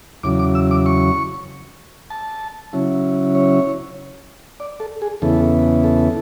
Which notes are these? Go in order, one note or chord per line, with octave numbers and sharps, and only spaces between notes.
E2 C#3 F#3 D6
D6
E6
D6
C#6
A5
C#3 F#3 C#4 E4
C#5
D5
A4
G#4
E2 C#3 E3 B3 A4
A4